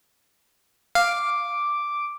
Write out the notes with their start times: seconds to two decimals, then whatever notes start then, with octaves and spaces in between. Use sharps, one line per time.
0.95 F5 D6